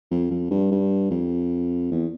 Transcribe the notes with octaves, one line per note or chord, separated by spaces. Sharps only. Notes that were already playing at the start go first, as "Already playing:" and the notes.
F2
F2
G2
G2
F2
E2